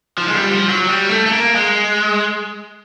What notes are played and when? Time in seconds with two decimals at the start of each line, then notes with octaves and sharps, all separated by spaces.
0.18 F3
0.27 G#3
0.35 G3
0.51 F3
0.69 F#3
0.87 G3
1.09 A3
1.26 A3
1.32 A#3
1.55 G#3